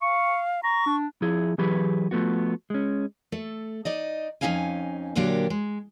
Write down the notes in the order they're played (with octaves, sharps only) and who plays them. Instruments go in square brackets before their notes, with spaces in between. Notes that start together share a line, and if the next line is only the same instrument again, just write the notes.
[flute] F5 [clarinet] C#6
[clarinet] A#5 [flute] C#6
[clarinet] D4
[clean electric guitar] F3 E4 G#4
E3 F#3 G4 G#4 B4
F3 A3 B3 F#4
G#3 C#4
[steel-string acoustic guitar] A3 A4
D#4 D5 D#5
F2 B3 C#4 D#4 F5 G#5
A#2 D3 F#3 A#3 D4 G4
G#3